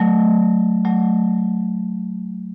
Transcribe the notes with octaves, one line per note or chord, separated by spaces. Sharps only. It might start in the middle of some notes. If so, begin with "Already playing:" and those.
Already playing: F#3 A3
F#3 A3